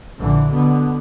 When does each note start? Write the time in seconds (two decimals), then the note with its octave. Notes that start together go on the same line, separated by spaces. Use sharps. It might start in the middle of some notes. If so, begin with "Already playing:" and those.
0.17 A#1 D3 E3
0.50 B2 D3 B3